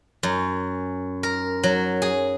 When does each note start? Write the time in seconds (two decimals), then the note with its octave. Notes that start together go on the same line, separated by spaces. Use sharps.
0.23 F#2
1.23 A#4
1.63 F#3
2.02 G#4